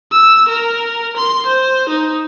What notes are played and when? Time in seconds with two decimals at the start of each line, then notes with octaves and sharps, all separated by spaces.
0.12 E6
0.49 A#4
1.17 C6
1.47 C5
1.89 D#4